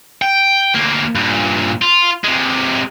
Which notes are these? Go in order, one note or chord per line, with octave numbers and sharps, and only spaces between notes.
G5
D2 A#3
G2 A#2
F4
C3 G#3